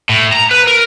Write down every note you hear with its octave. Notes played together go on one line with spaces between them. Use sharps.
A2
A#5
B4
A#4